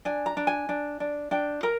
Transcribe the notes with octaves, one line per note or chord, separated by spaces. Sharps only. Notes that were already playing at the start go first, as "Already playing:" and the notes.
D4 G#5
A#5
D4
G#5
D4
D4
D4 G5
A#4 A#5